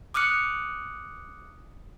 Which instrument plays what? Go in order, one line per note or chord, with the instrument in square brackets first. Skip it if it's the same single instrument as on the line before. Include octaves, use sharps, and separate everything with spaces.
[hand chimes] D6 D#6 F6 F#6 C#7